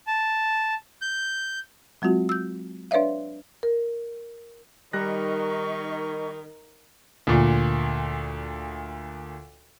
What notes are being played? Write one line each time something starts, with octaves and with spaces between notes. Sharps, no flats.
A5
G6
F#3 G#3 C4 F4 F#4
E6 G6
D4 B4 C#5 D5 E5 F5
A#4
D#3 G3 D#4 A#4 D#5 C#6 F#6 A#6
D2 A#2